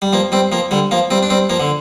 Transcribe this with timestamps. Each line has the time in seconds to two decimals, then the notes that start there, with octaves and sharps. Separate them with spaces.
0.02 G3
0.13 F3 A#3
0.32 G3 C4
0.52 F3 A#3
0.71 D3 G3
0.91 F3 A#3
1.11 G3 C4
1.23 D4
1.30 G3 C4
1.50 F3 A#3
1.60 D3